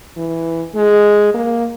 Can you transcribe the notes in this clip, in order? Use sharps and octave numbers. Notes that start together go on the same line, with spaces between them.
E3
G#3
A#3